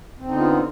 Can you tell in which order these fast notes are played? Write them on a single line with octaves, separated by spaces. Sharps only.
C4 D3 D#4 B3 F4